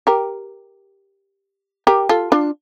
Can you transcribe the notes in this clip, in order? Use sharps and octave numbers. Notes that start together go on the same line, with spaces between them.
G4 A#4
G4 A#4
F4 A4
D4 F4